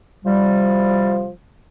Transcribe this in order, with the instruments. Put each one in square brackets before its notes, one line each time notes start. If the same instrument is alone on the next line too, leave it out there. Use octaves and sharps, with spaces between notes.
[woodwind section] C3 F3 G3